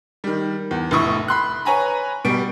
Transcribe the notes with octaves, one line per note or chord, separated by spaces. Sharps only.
D#3 G3
E2
F1 A2 E4 C#6 D#6
B5 C6 F#6
B4 C#5 G#5 A#5 B5
B2 G3 D7